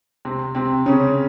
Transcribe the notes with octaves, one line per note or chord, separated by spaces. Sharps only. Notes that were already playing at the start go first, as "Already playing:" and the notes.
C3 C4
C3 C4
C#3 C#4